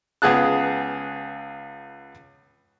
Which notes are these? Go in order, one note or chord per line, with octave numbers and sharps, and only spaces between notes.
C#2 B3 G#4 A5 F#6